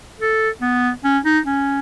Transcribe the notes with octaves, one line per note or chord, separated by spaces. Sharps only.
A4
B3
C#4
D#4
C#4